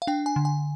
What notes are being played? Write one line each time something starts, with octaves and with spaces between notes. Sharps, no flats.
F5
D4 G5
G#5
D3
G#5